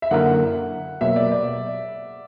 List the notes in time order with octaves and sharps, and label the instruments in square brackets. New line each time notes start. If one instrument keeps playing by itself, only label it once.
[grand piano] E5
[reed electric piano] F#2 D3 A#3 E4 A#4 [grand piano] F#5
[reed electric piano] B2 F#3 A#3 [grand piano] E5
[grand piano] D5
D5